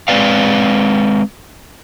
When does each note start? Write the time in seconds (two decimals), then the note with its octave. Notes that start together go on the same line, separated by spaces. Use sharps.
0.08 G#3 C4 D#4 B4 D5 F5